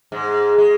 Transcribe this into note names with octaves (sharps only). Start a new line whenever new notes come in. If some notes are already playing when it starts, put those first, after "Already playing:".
G#2 G#3
G#3